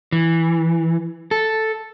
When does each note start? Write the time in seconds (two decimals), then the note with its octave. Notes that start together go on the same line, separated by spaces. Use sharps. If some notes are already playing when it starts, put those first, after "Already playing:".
0.12 E3
1.31 A4